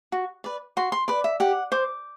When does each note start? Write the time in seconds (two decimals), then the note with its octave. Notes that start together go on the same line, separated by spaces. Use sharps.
0.12 F#4
0.44 B4 D5
0.77 F#4 C6
0.92 C6
1.08 B4 D5 B5
1.24 E5
1.40 G4 F#5
1.72 C5 D6